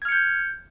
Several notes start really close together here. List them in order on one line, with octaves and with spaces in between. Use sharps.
G#6 F6 C#7 G6